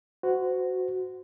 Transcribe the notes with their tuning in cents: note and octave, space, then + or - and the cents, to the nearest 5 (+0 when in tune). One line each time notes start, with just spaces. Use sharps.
F#4 +0 C5 -30